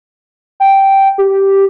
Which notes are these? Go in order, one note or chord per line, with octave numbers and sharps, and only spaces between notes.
G5
G4